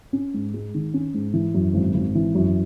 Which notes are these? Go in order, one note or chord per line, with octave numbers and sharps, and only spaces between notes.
C#4
G#2
G#3
D#3
C#4
G#2
E3
F#2
G#1
G#1
E3
F#2